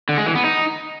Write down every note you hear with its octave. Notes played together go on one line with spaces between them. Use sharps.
D3
G#3
E3
B3
D#4